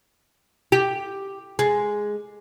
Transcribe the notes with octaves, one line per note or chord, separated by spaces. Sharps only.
G4
G#3